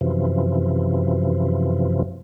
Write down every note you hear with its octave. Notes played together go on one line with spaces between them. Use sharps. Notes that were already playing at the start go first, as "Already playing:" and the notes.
F#2 C3 E3 F3